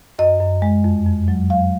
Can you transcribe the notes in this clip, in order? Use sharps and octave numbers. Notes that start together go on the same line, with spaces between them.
F#2 D#5
F#2
G#3
F2
F2
F#3
F#3 F5